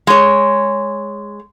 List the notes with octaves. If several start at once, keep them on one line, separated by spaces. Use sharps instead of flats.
G#3 C#5